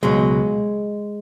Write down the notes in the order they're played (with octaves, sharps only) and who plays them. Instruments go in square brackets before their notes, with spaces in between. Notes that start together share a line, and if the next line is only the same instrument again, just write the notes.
[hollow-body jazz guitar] C#2 B2 F#3 G#3